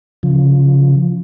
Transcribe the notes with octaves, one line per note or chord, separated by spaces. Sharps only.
C#3 F3